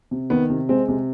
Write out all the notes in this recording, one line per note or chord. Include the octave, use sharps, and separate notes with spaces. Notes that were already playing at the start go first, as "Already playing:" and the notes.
C3
D#3 B3
C3
G#3 C4
C3